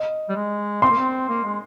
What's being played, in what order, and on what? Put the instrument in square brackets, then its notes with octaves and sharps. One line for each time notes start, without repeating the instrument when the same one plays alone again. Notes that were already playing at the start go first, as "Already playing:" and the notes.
Already playing: [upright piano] D#5
[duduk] G3
G#3
[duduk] C4 [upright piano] C6
[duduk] A#3
C4
A#3
G#3